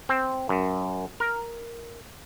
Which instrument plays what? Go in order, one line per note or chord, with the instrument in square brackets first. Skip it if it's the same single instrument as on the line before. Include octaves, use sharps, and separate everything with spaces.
[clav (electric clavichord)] C4
F#2
A#4